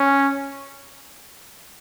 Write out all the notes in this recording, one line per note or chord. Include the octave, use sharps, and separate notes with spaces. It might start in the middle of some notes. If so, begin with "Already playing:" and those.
Already playing: C#4